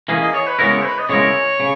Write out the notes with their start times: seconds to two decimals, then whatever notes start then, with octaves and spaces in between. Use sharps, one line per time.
0.08 E3 A#3 C#4 G#4
0.21 D#5
0.34 C#5
0.47 B4
0.59 C#3 G#3 B3 E4 A#4 C#5
0.85 B4
0.99 D#5
1.09 C#3 G#3 B3 E4 A#4 C#5
1.60 C#3